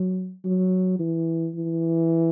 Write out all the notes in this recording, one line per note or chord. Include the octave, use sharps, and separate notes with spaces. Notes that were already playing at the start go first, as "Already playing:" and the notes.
Already playing: F#3
F#3
E3
E3